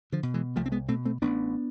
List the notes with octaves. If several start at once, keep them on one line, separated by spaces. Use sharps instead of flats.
D3 F3
B2
E3 G#3
C2 F3 A3
C4
G#3 B3
B2 A3 C4
A3 C4
A1 B3 D4